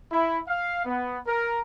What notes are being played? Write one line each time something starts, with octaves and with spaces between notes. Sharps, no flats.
E4
F5
B3
A#4